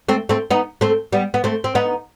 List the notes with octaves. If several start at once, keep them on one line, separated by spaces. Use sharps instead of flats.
A3 C4
A3 C4
B3 D#4
A3 C4
G3 B3
B3
A3 C4
C4
B3 D#4